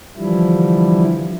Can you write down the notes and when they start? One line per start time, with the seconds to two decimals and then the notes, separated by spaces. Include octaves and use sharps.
0.17 D3 E3 F3 G3 E4